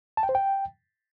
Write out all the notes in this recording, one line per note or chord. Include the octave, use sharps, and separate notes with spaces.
A5
G5
C5
G5